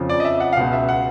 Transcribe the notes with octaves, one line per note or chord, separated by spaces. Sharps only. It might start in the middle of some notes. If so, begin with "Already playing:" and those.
Already playing: F2 C#3 F3
D5
D#5
E5
F#5
F5
C#2 B2 F#5
E5
F#5